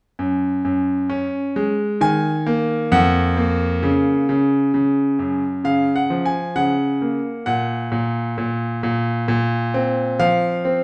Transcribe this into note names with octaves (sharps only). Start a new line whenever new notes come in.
F#2
F#2
C#4
G#3
D#3 G#5
A#3
F2 F#5
A#3
C#3
C#3
C#3
F#2
C#3 F5
F#5
F3
G#5
C#3 F#5
A#3
A#2 F#5
A#2
A#2
A#2
A#2
C4
F3 F5
C4